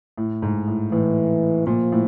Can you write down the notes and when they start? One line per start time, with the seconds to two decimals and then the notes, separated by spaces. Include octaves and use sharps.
0.18 A2
0.42 G#2
0.68 A2
0.92 A2 E3
1.67 A#2 F3
1.92 A2